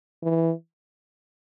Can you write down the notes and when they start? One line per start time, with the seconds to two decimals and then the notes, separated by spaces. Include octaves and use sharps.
0.23 E3